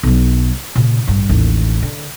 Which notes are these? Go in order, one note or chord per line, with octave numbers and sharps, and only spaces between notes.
B1 F#3
A#2 C#3
A1 G2
A1 D#2
D3